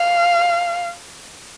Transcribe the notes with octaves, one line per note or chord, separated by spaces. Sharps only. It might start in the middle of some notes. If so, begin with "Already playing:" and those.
Already playing: F5